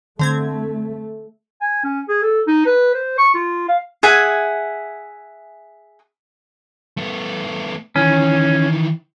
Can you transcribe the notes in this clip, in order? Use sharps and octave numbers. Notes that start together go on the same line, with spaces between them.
D3 A3 C4 G#6
G#5
C#4
G#4
A4
D#4
B4
C5
C#6
F4
F5
G#4 E5 F#5 G#5
A3 B3
D#3 E3 C#4